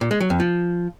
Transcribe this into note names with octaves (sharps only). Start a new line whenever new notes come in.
A#2
G#3
F#3
F2
F3